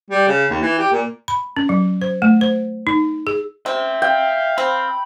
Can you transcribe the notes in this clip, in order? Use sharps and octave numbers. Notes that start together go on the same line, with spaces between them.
G3
C#3
D#2
E3
G4
A#2
B5
C#4
F#3
C5
A3
C5
D#4
G#4
C4 E5 C6
F5 G5
C4 B5